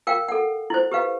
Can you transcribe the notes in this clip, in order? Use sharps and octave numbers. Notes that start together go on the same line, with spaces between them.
A#4 F5 G5
A4 F#5
E4 C5
G4 B4 F5